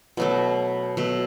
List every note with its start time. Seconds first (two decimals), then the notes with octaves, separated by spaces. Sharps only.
0.17 B2 F#3 A3
0.97 B2 F#3 A3